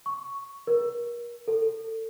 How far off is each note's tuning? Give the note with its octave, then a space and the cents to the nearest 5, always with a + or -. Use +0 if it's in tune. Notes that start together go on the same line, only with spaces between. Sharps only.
C#6 +0
A#4 +35
A4 +30